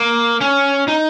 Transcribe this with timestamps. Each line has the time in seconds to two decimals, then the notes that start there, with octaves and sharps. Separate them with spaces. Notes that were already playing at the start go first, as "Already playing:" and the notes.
Already playing: A#3
0.41 C#4
0.88 D#4